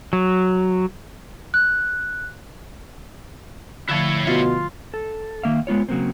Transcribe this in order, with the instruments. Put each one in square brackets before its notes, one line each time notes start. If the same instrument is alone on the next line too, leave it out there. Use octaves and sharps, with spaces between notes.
[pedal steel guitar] F#3
[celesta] F#6
[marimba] D3 F3 A3 [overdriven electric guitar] E4 C#5
[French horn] B2 [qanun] F4
[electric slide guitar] A4
D#3 A#3 E5 F5
G#3 B3 F4 C#5
C#3 F#3 A#3 C4